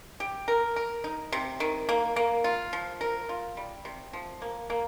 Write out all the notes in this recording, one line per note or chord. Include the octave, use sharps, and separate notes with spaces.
G4
A#4
A#4
D#4
C3
D#3
A#3
A#3
F4
F3
A#4
F4
G3
C3
F3
A#3
A#3